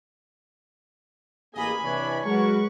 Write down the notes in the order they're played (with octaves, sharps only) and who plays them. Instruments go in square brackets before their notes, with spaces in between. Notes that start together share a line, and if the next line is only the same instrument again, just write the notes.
[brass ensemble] A1 G#4 D#5 [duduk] A#3 [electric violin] G#5 B5
[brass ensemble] C3 E3 D4 [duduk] C#5
[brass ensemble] F#3 F#4 A#4 [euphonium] G#3 [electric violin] B4 C#6